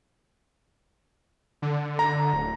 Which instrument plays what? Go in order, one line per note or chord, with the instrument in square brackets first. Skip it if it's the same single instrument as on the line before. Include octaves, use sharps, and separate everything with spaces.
[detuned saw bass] D3
[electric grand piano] A#5
[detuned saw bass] D1